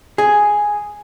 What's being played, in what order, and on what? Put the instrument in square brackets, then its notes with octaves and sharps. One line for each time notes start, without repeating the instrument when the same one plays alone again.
[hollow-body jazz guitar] G#4